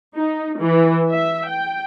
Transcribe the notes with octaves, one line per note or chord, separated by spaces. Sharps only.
D#4
E3
E5
G5